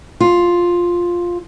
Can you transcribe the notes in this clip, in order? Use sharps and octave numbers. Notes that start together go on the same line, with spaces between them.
F4